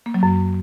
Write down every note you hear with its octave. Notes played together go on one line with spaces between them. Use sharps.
A#3
F#3
F#2